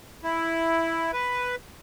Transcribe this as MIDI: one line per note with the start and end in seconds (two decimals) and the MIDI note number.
0.24 1.11 64
1.13 1.55 71